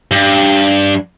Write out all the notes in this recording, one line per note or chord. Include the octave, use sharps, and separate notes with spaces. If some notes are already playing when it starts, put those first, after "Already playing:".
G2